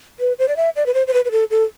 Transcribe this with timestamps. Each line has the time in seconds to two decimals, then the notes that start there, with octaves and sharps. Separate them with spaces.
0.20 B4
0.39 C5
0.48 D5
0.56 E5
0.76 D5
0.86 B4
0.94 C5
1.07 C5
1.13 B4
1.25 B4
1.31 A4
1.50 A4